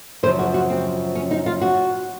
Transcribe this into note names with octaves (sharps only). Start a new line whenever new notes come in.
F#2 C#3 F3 C5
F#4
F#4
C4
C#4
D#4
F4
F#4